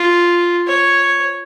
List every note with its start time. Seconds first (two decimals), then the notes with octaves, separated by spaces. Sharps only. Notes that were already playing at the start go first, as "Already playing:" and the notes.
Already playing: F4
0.67 C#5